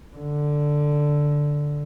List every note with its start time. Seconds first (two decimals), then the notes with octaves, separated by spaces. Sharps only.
0.16 D3